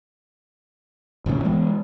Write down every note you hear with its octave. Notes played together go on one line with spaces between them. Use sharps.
G1 D2 A#2 C#3
E3 G#3 B3